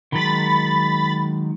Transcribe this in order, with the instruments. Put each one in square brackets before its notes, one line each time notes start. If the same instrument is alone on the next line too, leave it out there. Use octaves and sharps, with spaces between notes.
[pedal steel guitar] D#3 F#3 G#3 [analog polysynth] B5 A6